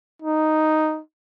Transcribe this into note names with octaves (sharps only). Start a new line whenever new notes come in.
D#4